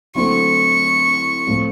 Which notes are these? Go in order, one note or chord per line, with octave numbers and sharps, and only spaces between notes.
D3 F#3 A3 C4 E4 C#6
A2 F3 A3 C4